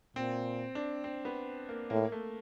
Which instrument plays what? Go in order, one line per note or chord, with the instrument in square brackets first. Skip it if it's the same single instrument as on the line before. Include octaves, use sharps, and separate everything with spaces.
[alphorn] A#2 [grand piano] C4
[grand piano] D4
C4
B3
A#3
[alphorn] A2 [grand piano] A#3
[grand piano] A3